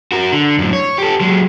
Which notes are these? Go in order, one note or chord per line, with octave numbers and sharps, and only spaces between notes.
F#4 A#4
D3
F#2 A2
C#5
G4 A4
F#3 G#3